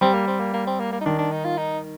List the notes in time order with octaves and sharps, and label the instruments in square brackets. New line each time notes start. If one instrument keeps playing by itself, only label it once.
[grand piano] G3 [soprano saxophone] C4
[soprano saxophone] A#3
C4
A#3
A#3
C4
A#3
A#3
D#4
[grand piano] D#3 [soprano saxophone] D4
[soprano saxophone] D4
D#4
F4
D#4